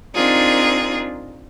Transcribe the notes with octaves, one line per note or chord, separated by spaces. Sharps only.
C4 D4 D#4 F4 G#4 A#4